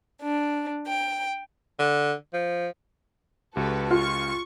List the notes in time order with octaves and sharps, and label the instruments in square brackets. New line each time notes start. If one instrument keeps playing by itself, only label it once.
[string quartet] D4
G5
[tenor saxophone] D3
F3
[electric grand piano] C#2 G4 [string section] F#4 A4 B4
[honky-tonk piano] F4 [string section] C#6